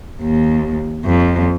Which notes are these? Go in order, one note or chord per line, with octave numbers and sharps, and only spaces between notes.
D#2
F2